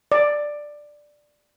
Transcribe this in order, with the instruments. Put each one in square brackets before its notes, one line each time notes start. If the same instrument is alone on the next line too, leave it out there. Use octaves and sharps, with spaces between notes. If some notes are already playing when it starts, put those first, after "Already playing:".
[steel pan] D5